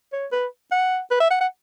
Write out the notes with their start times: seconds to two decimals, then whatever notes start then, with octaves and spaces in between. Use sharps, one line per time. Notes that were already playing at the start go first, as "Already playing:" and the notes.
0.13 C#5
0.32 B4
0.72 F#5
1.11 B4
1.21 E5
1.31 F#5
1.41 F#5